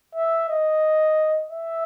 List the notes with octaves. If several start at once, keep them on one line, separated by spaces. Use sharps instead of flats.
E5
D#5
E5